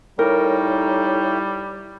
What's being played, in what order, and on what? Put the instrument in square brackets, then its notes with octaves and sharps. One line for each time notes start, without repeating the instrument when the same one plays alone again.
[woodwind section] A2 D#4 [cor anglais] G3 [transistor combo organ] E4 C#5 G5 [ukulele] A#4